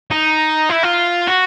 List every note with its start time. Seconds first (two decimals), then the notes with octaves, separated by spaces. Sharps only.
0.11 D#4
0.70 E4
0.83 F4
1.28 F#4